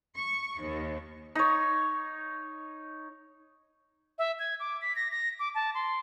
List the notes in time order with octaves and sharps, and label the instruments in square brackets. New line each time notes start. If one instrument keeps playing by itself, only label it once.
[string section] C#6
D#2
[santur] D#4 C#5
[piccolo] E5
G#6
D6
B6
A#6
A#6
D6
A5
C6